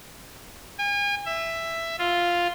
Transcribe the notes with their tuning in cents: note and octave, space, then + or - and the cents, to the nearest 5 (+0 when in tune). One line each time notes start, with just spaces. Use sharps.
G#5 -40
E5 +10
F4 +0